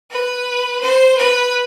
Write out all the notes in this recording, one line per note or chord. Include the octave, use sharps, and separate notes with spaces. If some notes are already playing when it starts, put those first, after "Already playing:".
B4
C5
B4